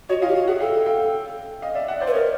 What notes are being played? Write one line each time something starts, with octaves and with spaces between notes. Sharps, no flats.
F#4 C#5 D#5
F4 D#5 F5
G4
F#4
G#4 E5 F#5
A4 F5 G5
F5 G5
D#5 F5
D5 E5
E5 F#5
C5 D5
B4
A#4 C#5 D#5